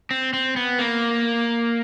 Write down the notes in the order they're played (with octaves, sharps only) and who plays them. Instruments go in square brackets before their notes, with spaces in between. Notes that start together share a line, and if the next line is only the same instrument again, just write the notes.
[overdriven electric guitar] C4
C4
B3
A#3